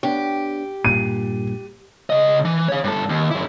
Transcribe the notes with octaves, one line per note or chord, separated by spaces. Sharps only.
B3 D4 G4 C#5
G2 A#2 D#7
C#3 D#5
E3
C#5 F5
G2 A4
D#2
F#2 E4